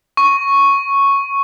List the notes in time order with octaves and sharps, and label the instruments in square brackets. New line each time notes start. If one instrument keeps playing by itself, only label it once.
[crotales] C#6